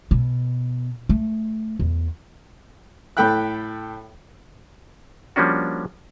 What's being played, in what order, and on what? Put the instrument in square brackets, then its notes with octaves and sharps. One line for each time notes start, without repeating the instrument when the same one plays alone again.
[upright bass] B2
A3
E2
[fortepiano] A2 A4 G5 B5 F#6
[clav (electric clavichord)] F3 G3 A#3 C#4 D4 F#4